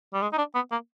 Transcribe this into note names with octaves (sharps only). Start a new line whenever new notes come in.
G3
G#3
D#4
D4
B3
A#3